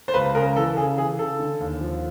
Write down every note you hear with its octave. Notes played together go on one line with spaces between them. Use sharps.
C5
C#2 B4
C#3 A#4
E3 A4
C#3 G#4
E3 G#4
C#3 A4
D3
D#2
F3